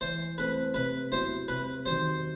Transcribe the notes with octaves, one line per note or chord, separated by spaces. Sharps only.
E3 C5
A3 C4 B4
C3 B4
F#3 B3 E4 C5
C3 B4
D#3 F#3 C5